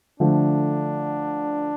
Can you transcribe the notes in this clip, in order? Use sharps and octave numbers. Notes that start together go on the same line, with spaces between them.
D3 F3 A3 D4